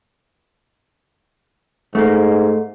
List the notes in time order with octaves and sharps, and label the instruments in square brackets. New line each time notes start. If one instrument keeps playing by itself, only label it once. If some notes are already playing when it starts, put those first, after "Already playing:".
[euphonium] G#2 [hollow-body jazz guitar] A3 A#3